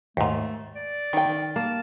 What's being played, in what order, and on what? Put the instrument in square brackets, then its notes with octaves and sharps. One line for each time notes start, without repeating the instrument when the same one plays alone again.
[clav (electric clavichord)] D#2 G#2 [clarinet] A3
[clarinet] D5
[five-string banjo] D#3 G5
[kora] A#3 [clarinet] A5